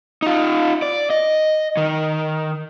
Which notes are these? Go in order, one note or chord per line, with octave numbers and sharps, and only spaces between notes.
D#4 F4
D5
D#5
D#3